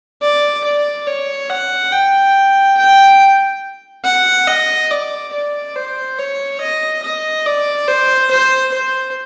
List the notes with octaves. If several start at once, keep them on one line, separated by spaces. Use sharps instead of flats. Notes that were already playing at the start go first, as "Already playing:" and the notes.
D5
D5
C#5
F#5
G5
G5
F#5
D#5
D5
D5
C5
C#5
D#5
D#5
D5
C5
C5
C5